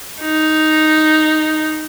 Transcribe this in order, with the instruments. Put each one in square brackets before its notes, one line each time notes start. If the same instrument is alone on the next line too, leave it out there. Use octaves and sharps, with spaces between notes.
[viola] D#4